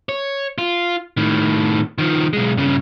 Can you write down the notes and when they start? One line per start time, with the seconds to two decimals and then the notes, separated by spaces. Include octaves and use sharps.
0.09 C#5
0.58 F4
1.17 A2 D#3
1.98 D#3 F3
2.33 B1 G#3
2.57 G2 C#3